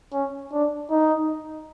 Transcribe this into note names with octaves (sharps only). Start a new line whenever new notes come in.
C#4
D4
D#4